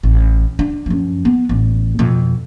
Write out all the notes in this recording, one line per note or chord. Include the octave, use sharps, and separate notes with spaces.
A1
D4
F#2 F3
B3
A1
F2 B2